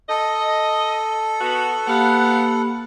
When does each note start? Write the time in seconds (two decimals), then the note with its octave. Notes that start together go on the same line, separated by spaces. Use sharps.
0.09 A4 D#5
1.40 B3 F#4
1.87 A#3 B3 G4 F5 F#5 B5